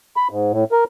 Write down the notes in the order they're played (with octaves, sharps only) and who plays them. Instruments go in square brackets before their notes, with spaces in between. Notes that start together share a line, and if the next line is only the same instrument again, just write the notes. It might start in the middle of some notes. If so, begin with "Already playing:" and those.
[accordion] B5
G#2
A2
A#4